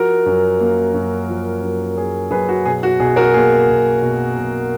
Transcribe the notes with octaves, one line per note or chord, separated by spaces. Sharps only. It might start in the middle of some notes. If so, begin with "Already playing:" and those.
Already playing: F3 F#4 A#4
F#2
A#3
F#2
F3
F#2
A#3 G#4
F#2 G#4 B4
F#4
B2 G#4
F#4
B1 G#4
F#4 A#4
A#3 G#4
B1
B2
B1